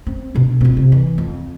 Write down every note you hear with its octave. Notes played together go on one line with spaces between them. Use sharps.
C4
B2 D4
C4 F4
C3
E3
F2